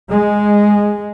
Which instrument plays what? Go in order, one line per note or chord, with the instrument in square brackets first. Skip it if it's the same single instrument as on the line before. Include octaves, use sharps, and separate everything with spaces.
[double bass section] G#3